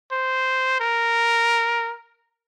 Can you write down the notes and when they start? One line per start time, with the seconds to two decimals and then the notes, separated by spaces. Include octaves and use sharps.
0.12 C5
0.80 A#4